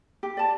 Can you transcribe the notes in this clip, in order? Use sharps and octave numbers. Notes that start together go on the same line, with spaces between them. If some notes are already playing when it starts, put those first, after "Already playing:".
G4
D5 A5